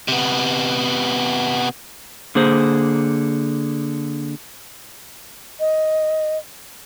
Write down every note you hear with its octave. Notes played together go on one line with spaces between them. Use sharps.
C3 B3
D3 A#3 G#4 C5
D#5